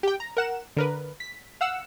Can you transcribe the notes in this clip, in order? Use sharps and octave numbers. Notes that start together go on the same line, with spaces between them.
G4 G5
A#5
A#4 F#5 E7
D3 A#4 B4
B6
F5 F#5 E6